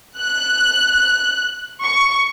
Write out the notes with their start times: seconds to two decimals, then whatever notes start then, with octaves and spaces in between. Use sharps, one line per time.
0.19 F#6
1.84 C#6